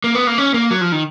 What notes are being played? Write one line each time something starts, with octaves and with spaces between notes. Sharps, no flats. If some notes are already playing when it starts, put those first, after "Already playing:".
A#3
B3
A#3
C#4
A#3
F#3
F3
D#3